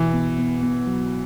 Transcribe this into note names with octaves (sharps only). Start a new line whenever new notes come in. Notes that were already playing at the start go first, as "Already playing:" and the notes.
Already playing: B2 E3
B3
B3
B3
F#3